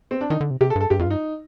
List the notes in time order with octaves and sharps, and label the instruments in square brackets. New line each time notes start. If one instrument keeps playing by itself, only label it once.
[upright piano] C4
D4
[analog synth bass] D#3 [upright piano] D#4
[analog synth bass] D3
C3
[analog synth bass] C3 [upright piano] G4
[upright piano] A4
[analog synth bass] G2
[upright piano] A4
[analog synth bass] G2 [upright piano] G4
[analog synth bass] F2 [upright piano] F4
[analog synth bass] G2 [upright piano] D#4